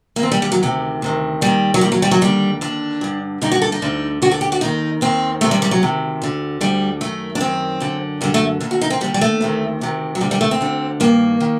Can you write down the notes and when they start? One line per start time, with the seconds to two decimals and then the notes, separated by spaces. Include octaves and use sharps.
0.16 A#3
0.22 D#2 D3 C4
0.32 G3
0.42 G3
0.52 F#3
0.63 D2 C3 D#3
1.02 D2 C3 D#3
1.41 D#2 D#3 G3
1.74 F#3
1.81 D#2 D#3 G3
1.92 F#3
2.02 G3
2.11 F#3
2.21 D#2 D3 G3
2.61 D#2 D3 D4
3.01 G2 D3
3.41 G2 D3 D#4
3.52 F#4
3.62 A4
3.72 D#4
3.82 D2 D3
4.22 D2 D3 F#4
4.31 A4
4.41 G4
4.52 F#4
4.61 D#2 D#3 D#4
5.01 D#2 D#3 C4
5.41 D2 C3 D#3 A3
5.51 G3
5.62 G3
5.71 F#3
5.82 D2 C3 D#3
6.22 D2 D3
6.61 D2 D3 G3
7.01 F#2 D#3 A3
7.35 D4
7.41 F#2 D#3 C4
7.80 F#2 D3
8.21 F#2 D3 G3
8.34 A3
8.60 D#2 D3
8.71 F#4
8.81 D#4
8.90 C4
9.01 D#2 D3 G3
9.14 G3
9.21 A3
9.41 D2 C3 D#3
9.81 D2 C3 D#3
10.15 F#3
10.21 D2 D3 G3
10.31 G3
10.41 A3
10.51 C4
10.61 D2 D3
11.00 G2 D#3 A#3
11.40 D#3